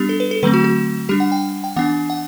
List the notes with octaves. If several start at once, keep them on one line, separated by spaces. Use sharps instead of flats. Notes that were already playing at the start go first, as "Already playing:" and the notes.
Already playing: G3 B3 D4 G4
A4
B4
A4
D3 F#3 A3 C4 B4
F#4
F#4
G3 D4 G4
F#5
G5
G5
E3 B3 D4 F#5
F#5